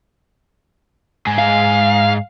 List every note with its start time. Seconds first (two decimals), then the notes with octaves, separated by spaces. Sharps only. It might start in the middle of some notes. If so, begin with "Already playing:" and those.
1.27 G#2 G#4
1.39 F5